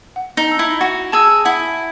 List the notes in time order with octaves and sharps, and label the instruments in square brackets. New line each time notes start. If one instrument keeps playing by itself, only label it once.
[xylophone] F#5
[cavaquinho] D#4
[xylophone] A5 E6
[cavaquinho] E4
[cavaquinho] F#4 [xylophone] F#5
[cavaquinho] G#4 [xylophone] A5 E6
[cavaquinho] E4 [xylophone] F#5